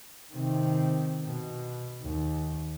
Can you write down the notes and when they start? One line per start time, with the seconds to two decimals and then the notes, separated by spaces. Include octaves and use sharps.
0.33 C3 D#3
1.24 B2
2.03 D#2